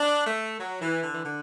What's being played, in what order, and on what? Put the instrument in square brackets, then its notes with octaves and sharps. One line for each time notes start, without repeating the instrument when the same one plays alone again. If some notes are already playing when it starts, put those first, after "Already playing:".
Already playing: [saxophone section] D4
A3
F#3
E3
D3
E3
D3